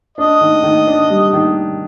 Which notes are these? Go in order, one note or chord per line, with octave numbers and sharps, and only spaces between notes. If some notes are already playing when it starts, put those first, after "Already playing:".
D4 D#5
D#3
D#3
D4
G3
D#3